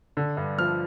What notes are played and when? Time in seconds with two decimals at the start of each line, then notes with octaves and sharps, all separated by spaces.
0.17 D3
0.37 G2
0.58 F3 F6